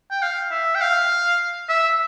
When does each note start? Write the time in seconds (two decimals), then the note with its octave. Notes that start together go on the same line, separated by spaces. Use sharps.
0.11 G5
0.22 F5
0.51 E5
0.75 G5
0.81 F5
1.69 E5